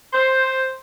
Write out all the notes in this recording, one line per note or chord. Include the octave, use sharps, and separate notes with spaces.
C5